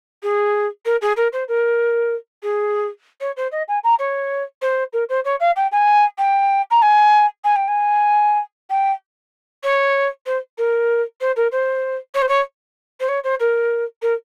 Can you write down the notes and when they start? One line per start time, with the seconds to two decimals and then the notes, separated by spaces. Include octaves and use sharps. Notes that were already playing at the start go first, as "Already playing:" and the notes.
0.22 G#4
0.85 A#4
1.01 G#4
1.16 A#4
1.32 C5
1.48 A#4
2.42 G#4
3.20 C#5
3.36 C5
3.51 D#5
3.68 G#5
3.83 A#5
3.99 C#5
4.61 C5
4.93 A#4
5.09 C5
5.24 C#5
5.40 F5
5.56 G5
5.72 G#5
6.18 G5
6.70 A#5
6.82 G#5
7.44 G#5
7.56 G5
7.68 G#5
8.70 G5
9.63 C#5
10.26 C5
10.57 A#4
11.20 C5
11.36 A#4
11.52 C5
12.14 C#5
12.22 C5
12.28 C#5
13.00 C5
13.08 C#5
13.24 C5
13.39 A#4
14.02 A#4